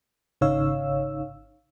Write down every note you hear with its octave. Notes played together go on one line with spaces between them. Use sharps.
G#1 C#3 D#4 C#5 F5 E6